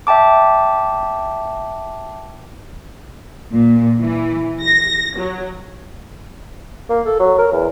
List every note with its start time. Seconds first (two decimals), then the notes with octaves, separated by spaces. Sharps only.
0.07 E5 G5 A5 D6
3.52 A#2
4.00 E3
4.62 A#6
5.18 F#3
6.89 A#3
7.06 A4
7.20 F#3
7.38 A#4
7.52 E2